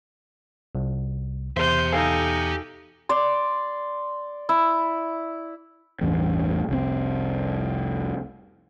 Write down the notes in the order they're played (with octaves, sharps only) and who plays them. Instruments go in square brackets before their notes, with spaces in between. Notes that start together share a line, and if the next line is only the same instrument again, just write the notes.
[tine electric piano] C2
[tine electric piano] E2 [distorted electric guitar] G4 E5 [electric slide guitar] C5 [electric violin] C6 G6
[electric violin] D#4 G5 [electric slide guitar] A4 F5 G#5
[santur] D5 C6
E4
[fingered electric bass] A1 E2 G2 A3
F1 C2 B2 C4